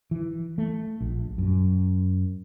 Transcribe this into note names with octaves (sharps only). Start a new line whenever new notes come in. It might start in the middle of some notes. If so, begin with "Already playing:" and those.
E3
A3
A#1
F#2